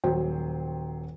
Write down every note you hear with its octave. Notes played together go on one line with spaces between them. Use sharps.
D#1 F#3 C5 G5